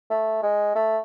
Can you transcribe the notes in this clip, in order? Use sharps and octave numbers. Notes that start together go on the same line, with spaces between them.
A3
G#3
A3